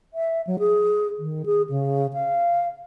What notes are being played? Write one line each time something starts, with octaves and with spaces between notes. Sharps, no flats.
E5
F#3
G#4
D#3
G#4
C#3
F5